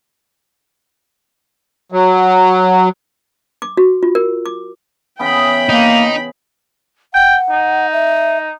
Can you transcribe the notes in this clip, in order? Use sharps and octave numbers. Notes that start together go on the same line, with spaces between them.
F#3
D6
F#4
F4
A#4
D6
C#3 E3 B3 G5 B5
A#3 D#4
F#5 G5
D#4
E5